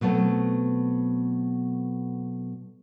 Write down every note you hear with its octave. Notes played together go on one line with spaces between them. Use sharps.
B2 F#3 A3 B3 C4